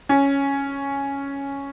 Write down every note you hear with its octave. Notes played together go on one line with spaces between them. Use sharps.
C#4